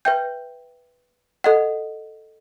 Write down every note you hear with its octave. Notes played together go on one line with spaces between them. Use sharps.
B4 E5 G5 G6
A4 D#5 F#5